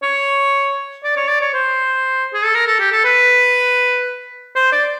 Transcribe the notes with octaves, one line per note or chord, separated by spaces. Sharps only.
C#5
D5
C#5
D5
C#5
C5
G#4
A4
A#4
A4
G4
A4
B4
C5
D5